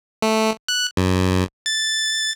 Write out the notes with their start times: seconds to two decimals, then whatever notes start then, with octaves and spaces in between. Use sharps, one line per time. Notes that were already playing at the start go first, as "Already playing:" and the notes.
0.22 A3
0.68 F#6
0.97 F#2
1.66 A6